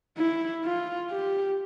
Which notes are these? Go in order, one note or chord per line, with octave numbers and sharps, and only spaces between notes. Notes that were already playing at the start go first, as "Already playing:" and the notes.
E4
F4
G4